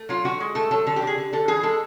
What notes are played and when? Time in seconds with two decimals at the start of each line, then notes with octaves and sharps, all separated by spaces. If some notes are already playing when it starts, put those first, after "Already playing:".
Already playing: A3
0.09 F#3 F4
0.24 D3 F#4
0.40 G#3
0.55 A3 A4
0.71 F#3 A4
0.86 D3 A4
0.96 G4
1.02 D3 G#4
1.18 D3
1.33 D3 A4
1.48 E3 G#4
1.63 G#3 A4